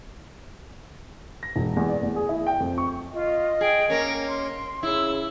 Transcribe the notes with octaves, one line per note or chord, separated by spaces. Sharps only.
A#6
E1
E2
D5
E2
G#4
E4
G5
F2
C#6
F4 D#5
G#4 G5
A#3 C#4 A#4
C6
C#3 E4 E6